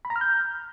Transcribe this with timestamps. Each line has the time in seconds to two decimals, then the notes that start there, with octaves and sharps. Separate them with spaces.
0.05 B5
0.10 A#5
0.16 F6
0.21 G6